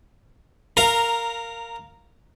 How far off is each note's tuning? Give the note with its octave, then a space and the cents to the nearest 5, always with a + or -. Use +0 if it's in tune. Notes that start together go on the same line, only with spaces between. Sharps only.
A#4 -15 F5 +0 A#5 +0